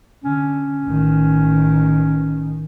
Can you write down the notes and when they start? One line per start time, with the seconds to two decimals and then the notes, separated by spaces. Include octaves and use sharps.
0.24 D3 C#4
0.85 A1 D#3